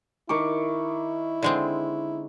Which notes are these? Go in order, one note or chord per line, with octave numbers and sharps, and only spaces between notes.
D#3 E4 C#6 D6
D3 G#3 C4